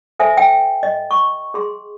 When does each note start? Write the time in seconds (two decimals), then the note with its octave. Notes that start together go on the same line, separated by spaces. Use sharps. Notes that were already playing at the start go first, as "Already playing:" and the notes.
0.19 A4 C5 E5 G#5
0.37 G5
0.83 D#5
1.11 C#6
1.54 G#4 C6